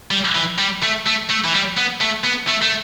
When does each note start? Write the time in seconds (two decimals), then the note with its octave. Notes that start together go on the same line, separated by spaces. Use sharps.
0.11 G3
0.35 E3
0.59 G3
0.83 A3
1.06 A3
1.29 A3
1.44 E3
1.53 G3
1.77 B3
2.01 A3
2.24 B3
2.48 A3
2.62 A3